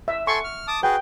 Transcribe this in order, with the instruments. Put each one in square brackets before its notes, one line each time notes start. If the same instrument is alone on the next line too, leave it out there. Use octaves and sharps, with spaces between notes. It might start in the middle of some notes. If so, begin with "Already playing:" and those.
[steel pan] E5
[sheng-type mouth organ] A4 G#5 C6 [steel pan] C#6
[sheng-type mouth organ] F6
A5 D6 D#6
[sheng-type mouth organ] F#4 G#4 B4 [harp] G5